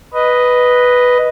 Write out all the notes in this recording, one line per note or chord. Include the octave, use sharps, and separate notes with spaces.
B4 D#5